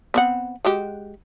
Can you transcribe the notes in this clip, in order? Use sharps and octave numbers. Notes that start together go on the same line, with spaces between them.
B3 C4 F#5
G#3 F#4 G4